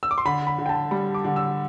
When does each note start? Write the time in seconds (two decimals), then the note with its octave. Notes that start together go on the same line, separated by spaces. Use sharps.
0.03 E6
0.11 D6
0.18 C6
0.25 D3 B5
0.47 B5
0.58 D3
0.66 G5
0.69 A5
0.91 G3 B5
1.14 D6
1.24 D3
1.36 E6